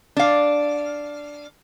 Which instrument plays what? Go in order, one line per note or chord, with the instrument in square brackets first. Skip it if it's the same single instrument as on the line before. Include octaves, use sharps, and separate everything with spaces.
[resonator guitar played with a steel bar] D4 F5